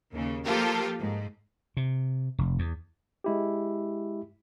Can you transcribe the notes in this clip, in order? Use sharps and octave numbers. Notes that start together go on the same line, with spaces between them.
D#2 C#3
F3 A#3 F4 G4 A4 A#4
G#2
C3
F1
E2
G#3 E4 G4